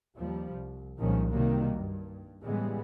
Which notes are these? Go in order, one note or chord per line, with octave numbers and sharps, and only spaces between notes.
D#2 F3 G3
C2
C2 A#2 D#3 F3 G#3 C#4
C3 D#3 F#3 G3 A#3
G2
A2 C#3 E3 G3 G#3 B3